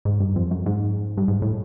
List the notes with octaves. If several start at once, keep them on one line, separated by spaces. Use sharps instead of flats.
G#2
G2
F2
F#2
G#2
G2
G#2
A2